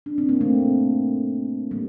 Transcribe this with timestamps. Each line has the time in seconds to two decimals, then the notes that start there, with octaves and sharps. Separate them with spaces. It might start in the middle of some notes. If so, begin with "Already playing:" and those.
0.06 D4
0.18 C4
0.29 A#3
0.41 A3 C4
1.71 G3 A#3